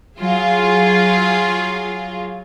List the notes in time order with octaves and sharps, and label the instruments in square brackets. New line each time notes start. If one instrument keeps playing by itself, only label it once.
[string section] F#3 F4 G#4